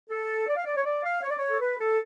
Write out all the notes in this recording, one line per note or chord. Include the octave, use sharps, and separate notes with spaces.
A4
D5
F5
D5
C#5
D5
F5
C#5
D5
C#5
A4
B4
A4